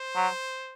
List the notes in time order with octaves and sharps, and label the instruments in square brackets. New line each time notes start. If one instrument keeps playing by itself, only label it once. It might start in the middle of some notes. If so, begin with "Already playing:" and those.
Already playing: [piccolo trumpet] C5
[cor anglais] F#3